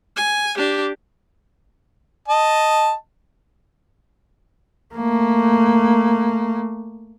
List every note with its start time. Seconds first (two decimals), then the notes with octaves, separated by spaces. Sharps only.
0.16 G#5
0.57 D4 G4
2.28 D#5 A5
4.95 A3 A#3